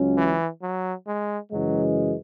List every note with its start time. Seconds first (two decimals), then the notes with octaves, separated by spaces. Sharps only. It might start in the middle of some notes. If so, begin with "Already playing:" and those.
Already playing: C#2 C#3 F#3 C#4
0.17 E3
0.62 F#3
1.07 G#3
1.52 F#2 C#3 E3 F#3 G#3